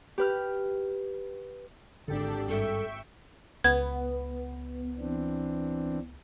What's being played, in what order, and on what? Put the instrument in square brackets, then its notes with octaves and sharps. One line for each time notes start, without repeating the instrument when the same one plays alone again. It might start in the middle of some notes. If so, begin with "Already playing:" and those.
[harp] G4 B4 F6
[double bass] G#1 [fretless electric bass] D3 [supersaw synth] D4 G4 A4
[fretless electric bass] G2 [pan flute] A4 [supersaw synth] E5 G5 C#6
[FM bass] C#2 [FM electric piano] B3 [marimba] G#6
[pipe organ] E3 C4 D4